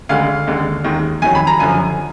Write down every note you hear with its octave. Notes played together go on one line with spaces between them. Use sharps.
D2 D3 G#3 F5
D#2 D3 G#3
D#2 D#3 G#3
F2 D#3 F#3 G#5
B5
A#5
F#2 D3 F3 G#5